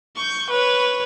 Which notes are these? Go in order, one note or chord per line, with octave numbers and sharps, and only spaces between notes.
C#6 G6
B4 C#5